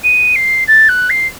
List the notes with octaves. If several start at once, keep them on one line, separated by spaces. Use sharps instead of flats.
D#7
C7
A6
F#6
C7